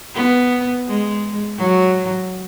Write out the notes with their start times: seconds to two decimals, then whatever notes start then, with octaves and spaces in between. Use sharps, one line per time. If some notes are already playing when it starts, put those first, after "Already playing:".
0.15 B3
0.87 G#3
1.58 F#3